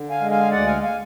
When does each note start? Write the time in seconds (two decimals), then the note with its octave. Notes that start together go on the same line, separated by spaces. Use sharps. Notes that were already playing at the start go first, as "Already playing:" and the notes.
Already playing: D3
0.10 F5 G#5
0.20 G#3
0.31 F5 G#5
0.51 D2 D5 F#5
0.67 F5 G#5
0.82 F5 G#5